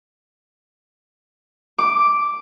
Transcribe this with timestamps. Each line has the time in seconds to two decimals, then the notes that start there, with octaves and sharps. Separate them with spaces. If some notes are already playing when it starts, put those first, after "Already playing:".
1.78 D6